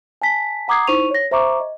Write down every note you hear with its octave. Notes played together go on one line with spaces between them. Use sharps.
G#5 A5 B6
F#5 A#5 D6 D#6 G#6 C7
D#4 E4 C5 C#6 D#7 F7
C#5 A#6
C5 E5 A#5 C#6 D6
D#5